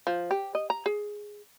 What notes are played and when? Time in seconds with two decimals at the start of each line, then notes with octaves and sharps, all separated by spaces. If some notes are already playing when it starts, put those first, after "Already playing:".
0.07 F3
0.31 G4
0.55 D#5
0.70 A#5
0.86 G#4